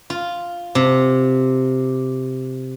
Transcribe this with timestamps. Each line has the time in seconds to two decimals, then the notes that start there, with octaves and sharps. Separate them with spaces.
0.10 F4
0.75 C3